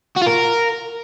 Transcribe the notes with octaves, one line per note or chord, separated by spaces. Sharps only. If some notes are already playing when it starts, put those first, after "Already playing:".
F#4
F4
A#4